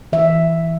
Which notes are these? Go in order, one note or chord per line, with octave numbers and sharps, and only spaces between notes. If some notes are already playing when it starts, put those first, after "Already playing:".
E3 E5